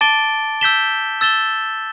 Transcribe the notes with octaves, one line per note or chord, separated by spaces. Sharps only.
A5 D6 A6 D7 G7
E6 G6 B6 E7 G7
E6 A6 E7 G7